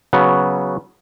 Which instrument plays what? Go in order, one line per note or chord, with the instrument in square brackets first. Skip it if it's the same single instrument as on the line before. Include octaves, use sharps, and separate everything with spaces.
[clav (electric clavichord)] C#3 F#3 B3